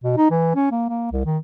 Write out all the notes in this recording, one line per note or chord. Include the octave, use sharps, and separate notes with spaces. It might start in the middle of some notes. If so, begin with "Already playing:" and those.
B2
D#4
E3
C#4
A#3
A#3
C2
D#3